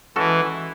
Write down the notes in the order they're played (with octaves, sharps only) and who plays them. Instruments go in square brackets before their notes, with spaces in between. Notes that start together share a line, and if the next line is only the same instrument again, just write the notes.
[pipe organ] E3 [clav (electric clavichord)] G#3 C#4 F#4 A4